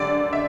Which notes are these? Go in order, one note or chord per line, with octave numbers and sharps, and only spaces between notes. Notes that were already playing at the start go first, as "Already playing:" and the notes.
Already playing: F#2 D3 G4 D5
E5